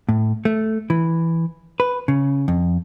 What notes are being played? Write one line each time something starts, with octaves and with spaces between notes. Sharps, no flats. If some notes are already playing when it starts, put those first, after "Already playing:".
A2
A3
E3
B4
C#3
F2